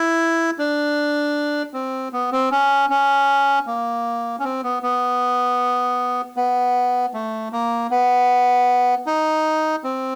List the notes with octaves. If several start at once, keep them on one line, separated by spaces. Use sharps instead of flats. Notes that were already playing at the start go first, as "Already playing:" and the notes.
Already playing: E4
D4
C4
B3
C4
C#4
C#4
A#3
C#4
C4
B3
B3
B3
A3
A#3
B3
D#4
C4